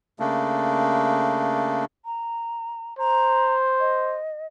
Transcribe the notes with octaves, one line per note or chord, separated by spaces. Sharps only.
C#3 A3 A#3 D4
A#5
C5 A#5
D#5